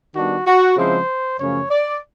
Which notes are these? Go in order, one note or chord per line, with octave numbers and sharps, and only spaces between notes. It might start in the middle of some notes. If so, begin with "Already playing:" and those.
D#3 G3 B3 D4 F#4
F#4
C#3 F3 G#3 C4 E4 C5
F#2 C#3 F3 A3 C#4 C#5
D5